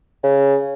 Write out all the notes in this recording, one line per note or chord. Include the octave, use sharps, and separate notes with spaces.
C#3